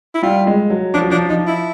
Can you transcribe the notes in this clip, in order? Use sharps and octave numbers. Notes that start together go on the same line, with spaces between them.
E4
G3 F4
G#3
F#3
F3 D4
F#3
F3 D4
F3 D#4
E4